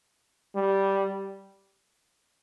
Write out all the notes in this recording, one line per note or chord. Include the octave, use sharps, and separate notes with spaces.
G3